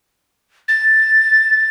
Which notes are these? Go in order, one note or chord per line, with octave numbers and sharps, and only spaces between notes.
A6